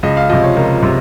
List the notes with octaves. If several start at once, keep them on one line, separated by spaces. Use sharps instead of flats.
C#2 D#5
F5
C3 F3 D#5
C#5
C#2 A#4
C3